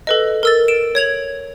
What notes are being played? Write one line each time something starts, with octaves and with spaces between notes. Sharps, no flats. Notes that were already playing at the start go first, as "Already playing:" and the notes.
A4 B4 D#5
A#4 E6 A6
D7 E7
C#5 G#6 F7 F#7